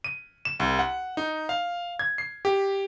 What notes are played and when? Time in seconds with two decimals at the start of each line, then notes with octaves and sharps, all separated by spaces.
0.04 D#7
0.45 E7
0.60 C2
0.79 F#5
1.17 D#4
1.49 F5
1.99 G#6
2.18 C7
2.45 G4